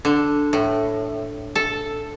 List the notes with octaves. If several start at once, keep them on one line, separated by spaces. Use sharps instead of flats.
D3
A2
A4